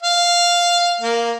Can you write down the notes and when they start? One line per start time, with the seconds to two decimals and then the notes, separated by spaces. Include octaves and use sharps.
0.03 F5
1.01 A#3